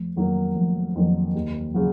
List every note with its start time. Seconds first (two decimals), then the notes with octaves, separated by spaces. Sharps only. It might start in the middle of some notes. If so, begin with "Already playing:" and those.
Already playing: F1
0.16 F2 D#3 F#3 A#3
0.55 F1
0.95 F2 D#3 F#3 A#3
1.35 D#2
1.74 C#3 F#3